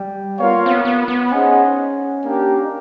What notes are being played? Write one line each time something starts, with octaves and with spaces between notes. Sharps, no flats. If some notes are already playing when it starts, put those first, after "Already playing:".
Already playing: G3
B3 F4 A#4 C#5 F5
A#3
C4
B3
B3
B3
C#4 D#4 G#4 C5 D#5 F#5
A#3 D4 G4 A#4
D#4